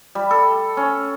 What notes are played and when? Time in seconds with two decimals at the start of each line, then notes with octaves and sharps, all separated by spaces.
0.15 G3
0.31 A4
0.77 C#4